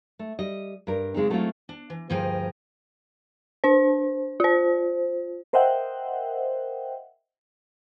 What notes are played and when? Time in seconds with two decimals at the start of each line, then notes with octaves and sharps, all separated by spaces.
0.19 A3
0.39 G3 D#5
0.87 G2 A#4
1.14 C#3 G#3 C4 D#4
1.30 F#3 A3 C4 C#4 E4 F4
1.69 D4
1.90 E3
2.10 D2 G2 F3 G#4 A#4 G5
3.64 D4 C5
4.40 F4 C5
5.53 A#4 C5 D#5 E5 F#5 G5